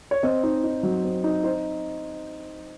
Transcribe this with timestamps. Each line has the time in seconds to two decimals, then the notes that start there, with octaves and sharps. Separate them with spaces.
0.11 C#5
0.23 C4 D#5
0.43 D#4
0.64 D#4
0.83 F#3
1.04 C4
1.24 D#4
1.44 D#4 C5